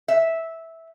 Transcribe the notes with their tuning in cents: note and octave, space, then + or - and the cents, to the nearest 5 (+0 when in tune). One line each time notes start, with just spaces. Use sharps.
E5 -10